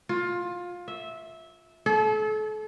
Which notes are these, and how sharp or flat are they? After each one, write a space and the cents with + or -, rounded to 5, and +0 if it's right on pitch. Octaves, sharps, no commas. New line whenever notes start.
F4 +20
E5 -15
A4 -35